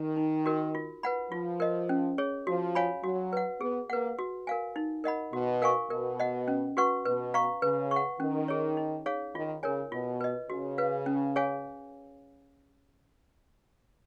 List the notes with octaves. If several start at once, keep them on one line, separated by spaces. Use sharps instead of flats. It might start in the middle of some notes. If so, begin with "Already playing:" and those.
Already playing: D#3
D#4
F#4 A#4
F4
B4 F#5 B5
F3 F4
A#4 D#5
C#4
G#4 C#5
F3 F#4
C#5 F5 G#5 B5
F#3 F#4
B4 F#5
B3 G#4
A#3 B4 F#5
F#4
A#4 F5 G#5
D#4
A#4 D#5 F#5 B5
B2 F#4
A#4 F5 G#5 C#6
B2 A#4
D#5 F#5
C#4
F#4 B4 F#5 C#6
B2 B4
F5 A#5 C#6
C#3 B4
C#6
F#5
D#3 C#4
G#4 C#5
D#4
G#4 C#5 F5
D#3 F4
C#3 A#4 C#5 G#5
B2 F4
B4 D#5
C#3 F#4
B4 F5
C#4
G#4 C#5 F5 G#5